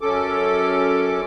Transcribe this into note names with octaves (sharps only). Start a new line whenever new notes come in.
F#2 C#4 A4 D6